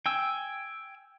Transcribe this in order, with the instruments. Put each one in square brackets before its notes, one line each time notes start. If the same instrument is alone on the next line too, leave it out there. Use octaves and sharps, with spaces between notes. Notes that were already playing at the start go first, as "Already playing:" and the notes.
[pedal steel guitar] G5 G#5 E6